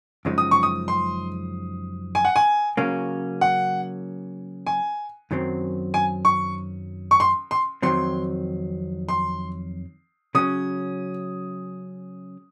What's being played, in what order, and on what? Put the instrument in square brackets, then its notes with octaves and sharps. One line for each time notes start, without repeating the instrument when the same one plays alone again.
[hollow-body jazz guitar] F#2 C#3 F3 G#3 D#4
[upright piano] D#6
C#6
D#6
C6
G#5
F#5
G#5
[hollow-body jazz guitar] C#3 F#3 A#3 C#4
[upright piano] F#5
G#5
[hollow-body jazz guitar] F#2 D#3 F#3 C4
[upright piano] G#5
C#6
C#6
C6
C6
[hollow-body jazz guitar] F2 D#3 F#3 C4 [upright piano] C6
[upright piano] C6
[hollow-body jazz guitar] C#3 F#3 C#4 [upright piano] D#6